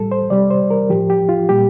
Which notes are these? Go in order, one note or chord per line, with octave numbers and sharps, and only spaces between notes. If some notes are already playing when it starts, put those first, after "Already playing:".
Already playing: A2 G3 A4
C5
C3 G3 D5
C5
A#4
A2 F3 G4
G4
F4
A#2 G3 G4